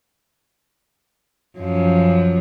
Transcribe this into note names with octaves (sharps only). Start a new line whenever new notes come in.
F#2 F3